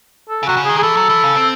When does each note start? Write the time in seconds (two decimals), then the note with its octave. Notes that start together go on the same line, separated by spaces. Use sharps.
0.29 A4
0.43 C#3
0.47 C3 F#4
0.57 C#3
0.65 D#3 G#4
0.76 D#3
0.79 G#4
0.83 E3 A4
0.97 F#3
1.10 E3
1.24 C#3
1.36 C4